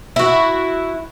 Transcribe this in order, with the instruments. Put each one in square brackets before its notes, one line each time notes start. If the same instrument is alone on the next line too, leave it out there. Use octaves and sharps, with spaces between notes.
[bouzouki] E4 F#4